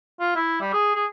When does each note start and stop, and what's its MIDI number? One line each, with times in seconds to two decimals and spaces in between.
0.20 0.35 65
0.36 0.61 64
0.61 0.72 55
0.73 0.92 68
0.95 1.06 68